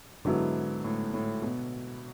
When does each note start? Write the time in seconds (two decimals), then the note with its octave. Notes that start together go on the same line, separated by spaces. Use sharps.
0.25 G#2 D3 F#3 B3 E4
0.84 A2
1.14 A2
1.42 B2